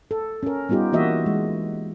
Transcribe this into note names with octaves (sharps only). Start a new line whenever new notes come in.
A4
C#4 A#4
G3 B3 D#4 F4 G4
E3 A#3 F#4 D#5 E5
G#3